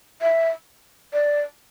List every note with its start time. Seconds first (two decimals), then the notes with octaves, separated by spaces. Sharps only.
0.22 E5
1.13 D5